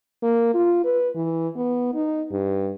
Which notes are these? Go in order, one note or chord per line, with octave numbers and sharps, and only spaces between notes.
A#3
F4
B4
E3
B3
D#4
G2